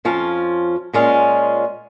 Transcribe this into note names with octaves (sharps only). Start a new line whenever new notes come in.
F2 F3 C#4 F4
A#2 G#3 C#4 F4